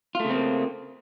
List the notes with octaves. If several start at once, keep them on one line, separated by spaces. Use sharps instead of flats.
C#3 A3 A#3 C4 F4